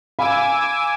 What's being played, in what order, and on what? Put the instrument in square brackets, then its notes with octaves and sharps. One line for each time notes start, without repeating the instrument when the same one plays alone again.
[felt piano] F5 B5 [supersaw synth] G#5 D6 E6